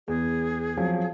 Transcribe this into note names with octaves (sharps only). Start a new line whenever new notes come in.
E2 G#4
F3 F#3 C4